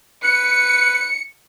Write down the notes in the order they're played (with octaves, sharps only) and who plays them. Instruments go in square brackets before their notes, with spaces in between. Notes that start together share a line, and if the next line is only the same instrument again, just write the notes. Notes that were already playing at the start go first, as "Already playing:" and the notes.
[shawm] B4 [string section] C#7